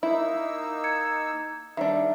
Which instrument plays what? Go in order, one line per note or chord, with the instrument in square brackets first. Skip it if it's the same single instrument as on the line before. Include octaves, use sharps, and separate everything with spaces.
[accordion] A#3 D#4 E6 [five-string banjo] E4
[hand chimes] G#6 C#7
[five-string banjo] D#3 G3 D4 [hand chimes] E5